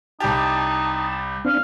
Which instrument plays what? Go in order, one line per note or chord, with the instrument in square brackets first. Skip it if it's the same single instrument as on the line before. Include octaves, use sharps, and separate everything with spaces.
[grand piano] C2 G4 [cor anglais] D#4 [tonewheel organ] A5
[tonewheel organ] C4 D4 [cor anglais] F5